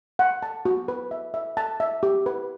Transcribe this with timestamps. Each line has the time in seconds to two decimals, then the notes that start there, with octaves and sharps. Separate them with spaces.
0.19 F#5
0.43 A5
0.65 F#4
0.88 B4
1.11 E5
1.34 E5
1.57 A5
1.80 E5
2.03 G4
2.26 B4